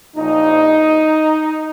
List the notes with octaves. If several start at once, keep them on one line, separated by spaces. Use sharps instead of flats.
A#1 A#2 F3 D#4